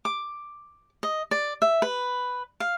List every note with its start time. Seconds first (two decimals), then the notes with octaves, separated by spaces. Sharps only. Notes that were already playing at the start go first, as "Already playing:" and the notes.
0.05 D6
1.03 D#5
1.31 D5
1.62 E5
1.82 B4
2.60 F5